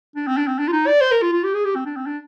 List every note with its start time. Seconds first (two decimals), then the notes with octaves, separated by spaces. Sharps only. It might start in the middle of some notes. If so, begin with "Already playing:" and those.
0.16 D4
0.27 C4
0.37 D4
0.47 C4
0.59 D4
0.68 F4
0.72 D#4
0.87 D5
1.01 C5
1.11 A#4
1.22 F4
1.32 F4
1.44 G4
1.54 G#4
1.65 G4
1.76 C4
1.86 D4
1.96 C4
2.06 D4